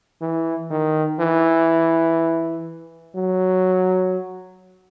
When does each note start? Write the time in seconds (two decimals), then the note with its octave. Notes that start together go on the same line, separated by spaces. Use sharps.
0.21 E3
0.70 D#3
1.20 E3
3.16 F#3